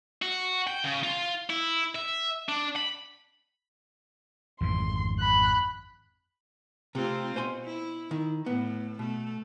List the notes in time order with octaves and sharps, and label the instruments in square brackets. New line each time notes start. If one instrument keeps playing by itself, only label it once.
[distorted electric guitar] F#4
G5
C#3
F4
E4
E5
D4
B5
[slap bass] G#1 F2 E3 [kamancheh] C6
[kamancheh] B5 F#6
[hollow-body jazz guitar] C3 [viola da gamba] A3 C4 F4
[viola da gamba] B2 [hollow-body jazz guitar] C5 G#5 C6
[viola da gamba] E4
[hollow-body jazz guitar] D#3
[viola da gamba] A2 [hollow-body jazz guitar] B3
[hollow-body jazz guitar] B2 [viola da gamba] A3